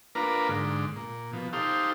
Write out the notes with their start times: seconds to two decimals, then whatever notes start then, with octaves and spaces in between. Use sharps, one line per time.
0.15 A#3 D4 F4 A#4 B4
0.49 G#2 D3
0.96 A#2
1.33 B2 F3
1.53 D#4 G4 A4 C5 F5